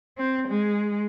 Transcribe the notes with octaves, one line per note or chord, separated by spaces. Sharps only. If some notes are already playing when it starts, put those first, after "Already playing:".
C4
G#3